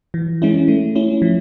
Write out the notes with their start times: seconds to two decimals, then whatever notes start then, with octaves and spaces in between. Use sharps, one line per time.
0.14 E3
0.42 G#3 C#4 E4
0.68 A3
0.96 C#4 E4
1.22 F3